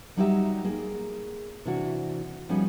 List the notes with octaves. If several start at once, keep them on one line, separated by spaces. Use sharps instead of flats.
F#3 G3 D#4 E4 G4 E5
A#3 G#4
C3 E3 D4 E4 F#4
F3 G3 B3 C#4 D#4 G#4